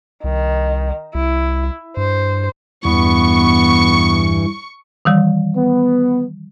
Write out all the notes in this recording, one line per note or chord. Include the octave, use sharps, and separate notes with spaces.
C2 D#3
C2 E4
G2 C5
E2 G2 E3 B3 C#6
D#3 E3 G3
B3